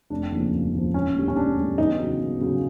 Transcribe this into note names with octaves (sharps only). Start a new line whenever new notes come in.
F1 D4
D#2 C#3 F3
F1
D#2 C#3 F3
E1 C#4
D2 D3 G3
C#4
E1 D4
D2 D3 G3
E2 D#4
C#3 F#3
E2
C#3 F#3